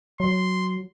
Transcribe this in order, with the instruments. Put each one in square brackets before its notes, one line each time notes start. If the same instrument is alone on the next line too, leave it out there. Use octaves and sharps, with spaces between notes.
[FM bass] F#3 [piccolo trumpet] C6